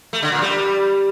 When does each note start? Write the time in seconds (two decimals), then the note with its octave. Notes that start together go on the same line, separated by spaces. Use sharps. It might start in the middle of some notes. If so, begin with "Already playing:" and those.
0.13 A3
0.23 D3
0.32 A#2
0.42 G3